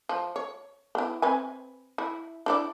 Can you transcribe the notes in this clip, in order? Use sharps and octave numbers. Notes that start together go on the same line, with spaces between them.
F3
C#5
B3 E4
C4 B4 G#5
E4
D4 E4 D5